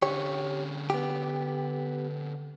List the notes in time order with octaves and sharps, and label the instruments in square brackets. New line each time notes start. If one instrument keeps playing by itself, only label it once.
[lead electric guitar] D3 C#4 [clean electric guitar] G4 C#5
[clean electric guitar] B3 G4